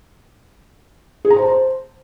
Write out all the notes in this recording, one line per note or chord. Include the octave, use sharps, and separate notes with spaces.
G#4
A#5
C5
A5
C5